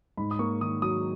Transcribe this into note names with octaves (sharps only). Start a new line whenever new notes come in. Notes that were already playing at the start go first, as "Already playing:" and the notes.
G#2 B5
D#6
A#3 C#6
D#3 D#6
F#3 D#6